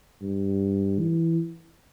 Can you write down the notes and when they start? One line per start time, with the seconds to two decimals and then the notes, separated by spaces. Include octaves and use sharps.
0.21 G2
0.99 E3